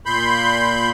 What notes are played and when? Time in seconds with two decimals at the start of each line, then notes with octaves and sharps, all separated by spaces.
0.06 A#2 B5 C6 G6